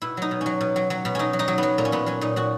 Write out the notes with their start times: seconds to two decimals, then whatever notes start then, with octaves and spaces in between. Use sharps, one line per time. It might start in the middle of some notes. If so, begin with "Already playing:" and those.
0.02 B2 E4
0.17 F#3 D#4
0.31 B2
0.41 C#4
0.46 F#3
0.61 B2
0.76 F#3
0.90 F#3
1.05 B2
1.15 F#3 C#4 D#4
1.33 F#3
1.39 D#4
1.48 F#3
1.58 F#3 B3
1.78 A#2 A#3
1.85 C#4
1.92 A#2 B3
2.06 F#3 C#4
2.21 A#2 D#4
2.36 A#2 F#4